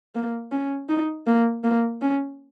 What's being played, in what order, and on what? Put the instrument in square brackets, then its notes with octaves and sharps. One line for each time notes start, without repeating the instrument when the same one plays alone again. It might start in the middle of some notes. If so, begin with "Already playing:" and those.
[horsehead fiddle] A#3
C#4
D#4
A#3
A#3
C#4